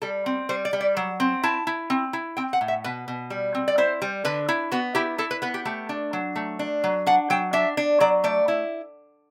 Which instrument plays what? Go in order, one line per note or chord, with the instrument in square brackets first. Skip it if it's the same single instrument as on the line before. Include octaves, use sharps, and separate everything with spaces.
[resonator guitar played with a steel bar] G3 A4
C4
G3 C5
D5
G3
D5
F#3
C4
E4 A5
E4
C4
E4
C4 G5
F#5
A2
E5
B2 B4
B2
G3
C4
D5
E4 C5
G3
D3 B4
E4
B3 F#4
E4 G4
E4 A4
B4
B3 B4
G4
A3 G4
D4
F#3
A3
D4
F#3
D4 F#5
F#3 G5
D4 E5
D4
F#3 D5
A3 D5
E4